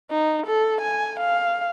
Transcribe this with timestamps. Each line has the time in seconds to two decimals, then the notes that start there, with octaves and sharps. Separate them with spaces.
0.11 D#4
0.47 A4
0.82 G#5
1.20 F5